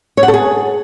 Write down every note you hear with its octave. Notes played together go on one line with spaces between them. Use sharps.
C#5
F#5
A4
G#4